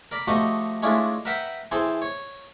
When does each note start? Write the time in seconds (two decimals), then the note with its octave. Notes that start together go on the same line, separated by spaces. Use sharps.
0.11 A#4 D5 B5
0.28 F3 A3 D#4 F#4 G4 D#5
0.83 G#3 A3 C#4 D4 E4 F4
1.25 A#4 B4 E5 F#5 G5
1.72 E3 C4 G#4 A4 C5
2.02 C#5